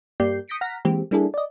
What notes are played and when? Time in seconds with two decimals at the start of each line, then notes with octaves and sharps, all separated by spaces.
0.20 G2 A#3 G4 D5 G6 C7
0.48 D#6 G6 A#6 B6 C#7 D7
0.61 F#5 A#5 F6 A#6 B6
0.85 E3 G#3 A#3 C4 G4
1.11 G3 A#3 D4 E4 G#4 A4
1.34 D5 D#5